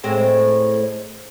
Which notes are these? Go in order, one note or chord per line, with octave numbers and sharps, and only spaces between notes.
A2 G#3 C4